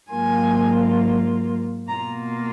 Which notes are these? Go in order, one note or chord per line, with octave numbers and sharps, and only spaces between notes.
G#2 F#3 A#3 F4 G#5
B2 A#3 F4 A#5